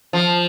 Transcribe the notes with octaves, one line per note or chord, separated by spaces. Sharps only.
F3